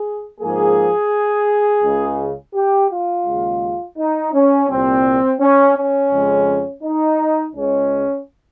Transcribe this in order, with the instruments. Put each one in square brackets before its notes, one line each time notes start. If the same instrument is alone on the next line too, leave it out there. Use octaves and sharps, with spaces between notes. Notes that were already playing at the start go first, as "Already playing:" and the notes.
Already playing: [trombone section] G#4
G#2 F3 A#3 G#4
C#2 C#3 G#3
G4
F4
D#2 C#3 G#3
D#4
C#4
C2 A#2 G3 C4
C#4
C#4
F2 C#3 G#3
D#4
C#2 C#3 G#3 C#4